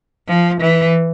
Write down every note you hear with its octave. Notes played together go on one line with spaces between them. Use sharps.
F3
E3